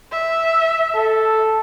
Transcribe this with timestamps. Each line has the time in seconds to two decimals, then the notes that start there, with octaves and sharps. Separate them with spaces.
0.12 E5
0.95 A4